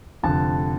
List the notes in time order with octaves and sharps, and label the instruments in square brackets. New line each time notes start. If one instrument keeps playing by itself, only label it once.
[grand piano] F1 F2 D3 A5